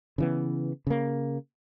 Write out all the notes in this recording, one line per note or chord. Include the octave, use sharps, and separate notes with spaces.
C#3 E3 B3
C#3 A#3